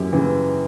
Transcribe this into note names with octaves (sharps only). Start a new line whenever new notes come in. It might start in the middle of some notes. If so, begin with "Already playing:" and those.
Already playing: F#2 E3 G4
C#3 E3